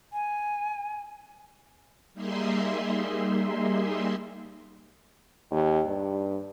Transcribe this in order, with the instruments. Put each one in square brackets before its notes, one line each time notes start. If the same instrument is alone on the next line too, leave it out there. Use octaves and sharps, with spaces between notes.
[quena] G#5
[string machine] G3 A#3 D#4 G#4 E5 C6
[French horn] D#2
G2